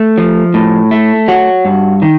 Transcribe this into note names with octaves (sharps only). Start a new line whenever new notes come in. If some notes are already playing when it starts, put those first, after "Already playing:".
Already playing: A3
F3
A2
A3
F#3 F#4
G2
D#3